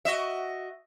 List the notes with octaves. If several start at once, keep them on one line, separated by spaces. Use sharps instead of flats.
F#4 D#5 E5